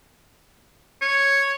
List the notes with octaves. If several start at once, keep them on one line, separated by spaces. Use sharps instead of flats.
C#5